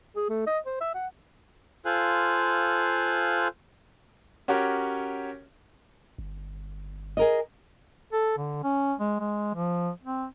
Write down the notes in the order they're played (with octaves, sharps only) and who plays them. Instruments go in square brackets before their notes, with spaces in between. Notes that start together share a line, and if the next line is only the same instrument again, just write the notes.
[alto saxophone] G#4
A3
D#5
C5
E5
F#5
[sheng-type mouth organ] F4 A4 C5 F5 G#5 F#6
[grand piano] C#4 F#4 G4 A#4 C#5
[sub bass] G1
[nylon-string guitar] G#4 A#4 D#5
[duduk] A4
D3
C#4
G#3
G#3
F3
C4